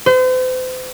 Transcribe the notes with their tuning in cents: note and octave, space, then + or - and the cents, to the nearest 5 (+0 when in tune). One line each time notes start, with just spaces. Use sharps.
C5 -40